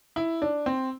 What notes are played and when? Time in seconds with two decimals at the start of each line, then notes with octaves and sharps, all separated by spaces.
0.16 E4
0.42 D4
0.66 C4